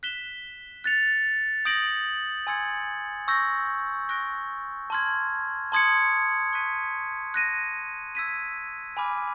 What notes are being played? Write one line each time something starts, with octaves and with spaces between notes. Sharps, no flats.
F#6 B6 E7 G7
F#6 A6 C#7 F7
D#6 G6 A#6 D7 F#7
G#5 C6 E6 G#6 C#7
C#6 E6 G6 A#6
C#6 F#6 A#6 D7
A5 C6 F6 G#6
A5 C6 D#6 G#6 C#7
C#6 F#6 B6 D#7
F#6 A#6 D#7
E6 G#6 B6 D#7
G#5 B5 D6 F6